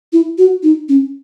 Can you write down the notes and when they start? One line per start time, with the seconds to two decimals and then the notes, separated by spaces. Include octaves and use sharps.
0.13 E4
0.38 F#4
0.63 D#4
0.89 C#4